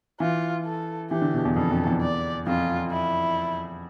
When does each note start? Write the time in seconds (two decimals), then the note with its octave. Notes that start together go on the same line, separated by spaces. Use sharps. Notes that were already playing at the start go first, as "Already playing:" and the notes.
0.20 E3 F4
0.65 A4
1.11 E3 G4
1.22 D3
1.34 B2
1.45 E2
1.56 F2 A4
1.71 F2
1.86 E2
2.01 D5
2.47 F2 F4
2.92 E4